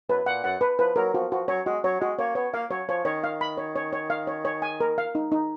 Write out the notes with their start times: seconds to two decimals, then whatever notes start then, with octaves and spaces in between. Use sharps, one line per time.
0.09 F#2 B4
0.26 A#2 F#5
0.44 F#2 F#5
0.61 B4
0.79 F3 B4
0.96 F#3 A#4
1.13 F3 F#4
1.31 F3 F#4
1.48 F#3 C#5
1.66 G#3 F#4
1.84 F#3 C#5
2.01 G#3 F#4
2.19 A#3 C#5
2.35 B3 C#5
2.53 A#3 F5
2.71 F#3 C#5
2.88 F3 C#5
3.05 D#3 C#5
3.24 F5
3.41 B5
3.58 C#5
3.76 C#5
3.93 C#5
4.10 F5
4.27 C#5
4.45 C#5
4.62 G#5
4.81 A#4
4.98 F5
5.15 D#4
5.32 D#4